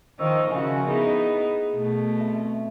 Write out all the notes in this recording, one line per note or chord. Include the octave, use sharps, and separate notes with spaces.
D#3 F3 D#4 C5 C#6 E6
C#3 F3 F#4 A#4 E5 G#5
B3 D#4 E4 G#4
B2 A3
C4 E5